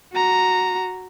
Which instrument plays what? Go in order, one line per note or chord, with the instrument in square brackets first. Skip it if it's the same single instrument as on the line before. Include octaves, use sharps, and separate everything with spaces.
[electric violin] F#4 A#5